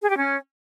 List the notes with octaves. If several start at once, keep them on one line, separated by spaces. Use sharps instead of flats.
G#4
G4
C#4